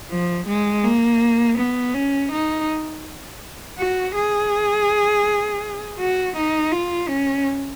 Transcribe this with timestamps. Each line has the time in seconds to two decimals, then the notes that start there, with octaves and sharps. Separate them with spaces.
0.11 F3
0.47 G#3
0.84 A#3
1.58 B3
1.94 C#4
2.32 D#4
3.78 F#4
4.15 G#4
5.99 F#4
6.36 D#4
6.72 F4
7.09 C#4